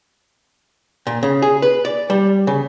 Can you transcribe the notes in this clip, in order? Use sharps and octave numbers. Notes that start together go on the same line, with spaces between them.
A#2
C#3
G#4
B4
D5
G3
C#3